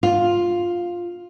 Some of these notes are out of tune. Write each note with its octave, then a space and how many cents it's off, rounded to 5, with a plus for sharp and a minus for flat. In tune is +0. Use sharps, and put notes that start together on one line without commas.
F4 +5